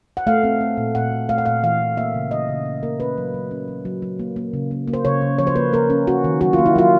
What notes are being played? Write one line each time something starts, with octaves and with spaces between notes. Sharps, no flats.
F#5
A3 F5
C4
C4
A#2
A#2 F#5
A#2
A3 F5
F#5
A#2 F5
E3 F5
E3
A#3 E5
C#3
E3 D#5
C#3
A#3
A#3 A#4
C#4 B4
F#3
F#3
C#4
F#3
F#3
F#3
A#3
A#3
C#3
A#3
A#3
C5
C#3 C#5
C#3
F3 C#5
C5
A#3 B4
A#3 A#4
C#4
C#4 F#4
D#3
F#3 F#4
F4
A#3
E4
F#3 F4